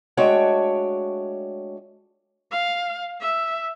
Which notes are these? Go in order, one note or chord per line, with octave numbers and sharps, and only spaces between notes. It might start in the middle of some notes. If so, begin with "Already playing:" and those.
G#3 A3 D4 F#4 C#5 G5
F5
E5